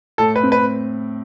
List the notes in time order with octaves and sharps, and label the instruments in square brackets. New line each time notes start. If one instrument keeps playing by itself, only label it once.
[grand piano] A2 [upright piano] A4
[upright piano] B4
[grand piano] C4
[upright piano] B4